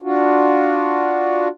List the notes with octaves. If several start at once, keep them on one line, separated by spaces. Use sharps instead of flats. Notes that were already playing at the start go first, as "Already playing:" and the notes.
D4 F4 F#4